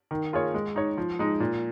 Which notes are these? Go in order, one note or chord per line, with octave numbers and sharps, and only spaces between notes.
D#3
A#3 F4 G#4 C#5
G#3
D#4 C#5
F3
G#3 D#4
A#2